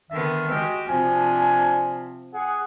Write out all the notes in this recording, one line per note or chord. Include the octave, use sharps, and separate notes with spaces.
D3 D#3 B3 E5
G#3 F#4 G4
C3 F3 D4 G#5
G#4 F#5